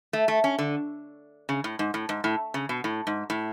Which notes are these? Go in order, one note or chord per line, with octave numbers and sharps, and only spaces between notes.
A3
A3
C#4
D3
C#3
A2
G#2
A2
G#2
A2
C#3
B2
A2
G#2
A2